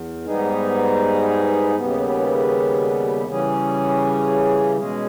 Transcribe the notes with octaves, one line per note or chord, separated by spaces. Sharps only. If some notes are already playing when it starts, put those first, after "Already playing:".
Already playing: E2
G#2 G3 B3 D#4 G#4
D#2 C#3 G3 B3
C#3 E3 G3 C#4 G#4
B2 G#3 C#4 G#4